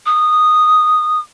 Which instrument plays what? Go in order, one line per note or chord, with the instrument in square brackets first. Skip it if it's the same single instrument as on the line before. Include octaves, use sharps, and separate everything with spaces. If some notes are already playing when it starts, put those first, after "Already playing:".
[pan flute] D#6